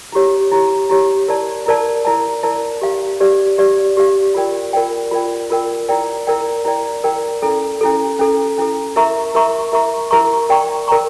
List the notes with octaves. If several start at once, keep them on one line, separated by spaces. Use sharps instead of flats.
E4 G4 C#5
E4 G4 C#5
E4 G4 C#5
E4 A#4 D5 A5
E4 A#4 D5 A5
E4 A#4 D5 A5
E4 A#4 D5 A5
G4 D5 F5
G4 D5 F5
G4 D5 F5
G4 D5 F5
F4 A#4 D5 G5
F4 A#4 D5 G5
F4 A#4 D5 G5
F4 A#4 D5 G5
E4 A#4 D5 G5
E4 A#4 D5 G5
E4 A#4 D5 G5
E4 A#4 D5 G5
C#4 E4 A4
C#4 E4 A4
C#4 E4 A4
C#4 E4 A4
E4 A#4 E5 A#5 C#6
E4 A#4 E5 A#5 C#6
E4 A#4 E5 A#5 C#6
E4 A#4 E5 A#5 C#6
A#4 D5 G5 A#5 C#6
A#4 D5 G5 A#5 C#6